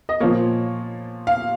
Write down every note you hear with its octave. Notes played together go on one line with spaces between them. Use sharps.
D#5
A#2 F3 A#3 C#5
F5